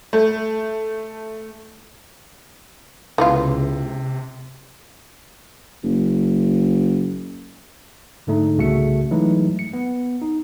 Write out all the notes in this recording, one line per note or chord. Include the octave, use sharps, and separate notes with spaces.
A3
C#2 C3 E3 B3 F4
F#1
G#2 D3 A3 D#4
C2 C#3 A3 F#4 E5 C#7
E3 F#3 G#3 A3 D#4 E4
C#7
B3
D#4